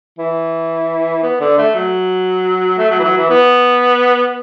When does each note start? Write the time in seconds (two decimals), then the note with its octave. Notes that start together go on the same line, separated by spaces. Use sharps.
0.19 E3
1.23 B3
1.40 D3
1.58 A3
1.75 F#3
2.78 A3
2.90 F#3
2.99 E3
3.03 F#3
3.17 E3
3.30 B3